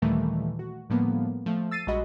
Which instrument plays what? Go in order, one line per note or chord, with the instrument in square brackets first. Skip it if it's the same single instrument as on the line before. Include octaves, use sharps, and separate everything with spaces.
[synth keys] D#2 A#2 D#3 E3 G3 A3
F#4
A2 D3 F3 G3 A#3 B3
F3 A3
E6 A6 C7 D#7
A#1 G3 G#3 F#4 D#5 B5